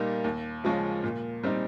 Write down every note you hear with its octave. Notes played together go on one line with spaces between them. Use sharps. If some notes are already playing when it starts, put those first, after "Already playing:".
Already playing: A#2 G3 A#3 D#4
D#2
C#3 F3 G#3 C#4
A#2
G3 C4 D#4